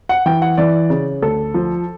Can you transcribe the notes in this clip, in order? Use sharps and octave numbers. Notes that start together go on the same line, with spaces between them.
F#5
E3 G5
F#5
E3 D5
C#3
D2 A4
F3